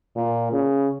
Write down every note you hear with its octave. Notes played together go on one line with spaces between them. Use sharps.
A#2
C#3